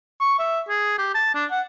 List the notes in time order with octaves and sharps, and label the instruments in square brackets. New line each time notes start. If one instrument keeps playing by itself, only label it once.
[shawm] C#6
E5
G#4
G4
A5
D4
F#5